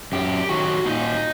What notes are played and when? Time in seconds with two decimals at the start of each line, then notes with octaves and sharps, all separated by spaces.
0.12 F#2 G4
0.49 D#3 F#3 A3 F#4
0.85 A#2 D#4